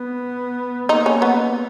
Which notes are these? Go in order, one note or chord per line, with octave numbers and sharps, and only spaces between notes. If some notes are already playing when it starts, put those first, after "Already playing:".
Already playing: B3
A#3 D#4
C#4
B3